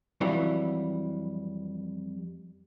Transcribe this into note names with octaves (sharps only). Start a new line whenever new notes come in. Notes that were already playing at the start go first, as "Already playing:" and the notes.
F2 E3 F#3 G3